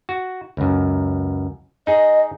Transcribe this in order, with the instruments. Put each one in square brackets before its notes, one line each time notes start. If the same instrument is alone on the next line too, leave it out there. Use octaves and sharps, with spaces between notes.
[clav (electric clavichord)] F#4
C#2 F#2
[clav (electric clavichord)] D#4 G#4 [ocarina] D#5